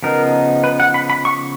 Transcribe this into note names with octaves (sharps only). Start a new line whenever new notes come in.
C#3 F3 B3 D#4 A#4
B4
F#5
B5
B5
C#6